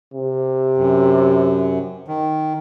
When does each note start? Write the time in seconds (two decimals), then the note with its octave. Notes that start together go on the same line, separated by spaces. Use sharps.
0.14 C3
0.77 F#2
2.08 D#3